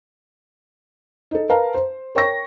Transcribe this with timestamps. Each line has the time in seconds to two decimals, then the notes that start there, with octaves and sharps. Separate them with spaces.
1.31 D#4 A4
1.49 A#4 B4 F5 A5 A#5
1.74 C5
2.15 A#4 C#5 G5 C#6 A#6